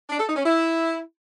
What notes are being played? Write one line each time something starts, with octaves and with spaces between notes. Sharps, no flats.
D4
A4
D#4
C#4
E4